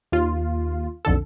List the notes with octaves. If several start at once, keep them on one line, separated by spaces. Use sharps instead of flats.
D#2 F4
B1 F2 D3 A4